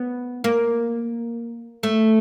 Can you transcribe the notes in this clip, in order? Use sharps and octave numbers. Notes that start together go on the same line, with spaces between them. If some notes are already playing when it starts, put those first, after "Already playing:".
Already playing: B3
A#3
A3